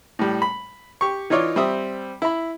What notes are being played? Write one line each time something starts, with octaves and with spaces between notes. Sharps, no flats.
A2 G3
B5
G4 C#6
E3 D#4 F4 C#5 D5
G3 C4 E5 D#6
E4 B5